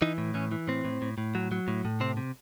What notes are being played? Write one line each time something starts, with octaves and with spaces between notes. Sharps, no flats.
E3 D#4
A2
E3 C#4
E3
A2 C4
A2
A2
A2
F#3
F#3
A2
A2
C3 C4
C3